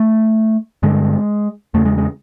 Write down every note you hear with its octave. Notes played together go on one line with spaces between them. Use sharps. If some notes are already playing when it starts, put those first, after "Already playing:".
Already playing: A3
G2 D3 G#3
E2 C#3 A3
G#3
G#3